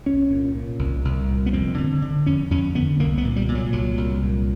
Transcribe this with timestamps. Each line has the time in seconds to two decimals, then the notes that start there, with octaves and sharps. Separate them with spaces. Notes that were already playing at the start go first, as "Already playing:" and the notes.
0.06 C2 C#4
0.30 A#2
0.55 A#2
0.79 C2
1.05 C2
1.29 A#2
1.46 B3
1.53 F2 C4
1.78 D3
2.02 D3
2.26 F2 C#4
2.51 F2 C#4
2.75 D3 B3
2.99 C2 A#3
3.18 B3
3.25 A#2
3.36 G3
3.48 A#2
3.55 F#3
3.73 C2 F#3
3.98 C2
4.23 A#2